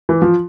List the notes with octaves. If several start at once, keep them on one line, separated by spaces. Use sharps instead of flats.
E3
F3